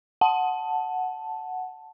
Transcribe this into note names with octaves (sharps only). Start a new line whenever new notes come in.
F#5 A5